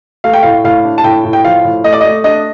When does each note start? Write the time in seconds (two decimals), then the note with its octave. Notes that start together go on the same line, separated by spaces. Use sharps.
0.24 A3 F5
0.33 G5
0.43 A2 F5
0.64 A2 F5
0.84 D4
0.98 A5
1.04 A2 G5
1.25 A2
1.33 G5
1.44 F3 F5
1.64 A2
1.84 A3 D#5
1.93 D5
2.01 A3 D#5
2.24 D4 D#5